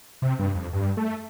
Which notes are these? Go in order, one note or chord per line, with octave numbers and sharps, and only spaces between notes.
C3
G2
F2
G2
A3